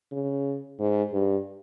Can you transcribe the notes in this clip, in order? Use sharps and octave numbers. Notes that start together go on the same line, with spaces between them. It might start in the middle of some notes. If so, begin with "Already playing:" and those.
C#3
G#2
G2